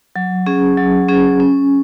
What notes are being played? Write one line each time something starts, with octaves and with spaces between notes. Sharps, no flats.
F#3
C#4 G#4
F#3
C#4 G#4
C#4